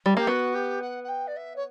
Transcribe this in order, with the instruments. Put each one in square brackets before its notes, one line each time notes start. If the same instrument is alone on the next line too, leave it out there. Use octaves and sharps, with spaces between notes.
[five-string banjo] G3
[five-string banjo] A#3 [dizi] G4
[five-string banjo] B3 [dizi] F#4
[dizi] G4
F#5
F#5
G5
D5
E5
C#5